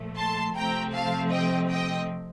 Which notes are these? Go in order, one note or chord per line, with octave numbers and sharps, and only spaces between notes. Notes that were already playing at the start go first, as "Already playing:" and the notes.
Already playing: A#2 F3 A3
A5 C6
C3 F3 A3 C4 G5 A#5
F5 A5
D#5 G5
D#5 G5